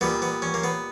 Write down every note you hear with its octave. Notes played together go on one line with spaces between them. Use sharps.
A#2 G3 B3
B3
C#4
A#3
B3